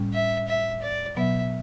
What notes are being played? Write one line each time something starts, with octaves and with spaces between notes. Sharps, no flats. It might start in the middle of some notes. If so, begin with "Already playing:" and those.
Already playing: A2 G3 C#4
E5
E5
D5
B2 F#3 B3 E5